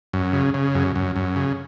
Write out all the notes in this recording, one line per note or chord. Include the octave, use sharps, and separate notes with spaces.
F#2
C#3
C#3
F#2
F#2
F#2
C#3